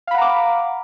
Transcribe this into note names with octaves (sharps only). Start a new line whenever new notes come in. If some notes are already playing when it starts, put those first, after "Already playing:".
F5 F#5 A#5 B5 D6